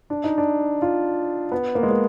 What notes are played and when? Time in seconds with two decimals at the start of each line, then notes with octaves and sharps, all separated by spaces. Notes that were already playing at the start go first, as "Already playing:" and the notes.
0.10 D4
0.24 D#4
0.38 D4
0.82 F4
1.52 B3
1.75 A#3
1.83 G#3
1.91 A#3